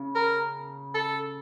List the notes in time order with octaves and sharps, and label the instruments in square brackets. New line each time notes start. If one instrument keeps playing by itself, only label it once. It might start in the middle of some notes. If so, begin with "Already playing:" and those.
Already playing: [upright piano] C#3
[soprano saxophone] A#4
A4